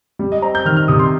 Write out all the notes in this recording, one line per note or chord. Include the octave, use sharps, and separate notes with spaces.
G3
D#5
C4 A#5
G6
D#3 F6
F6
C3 D#6
C6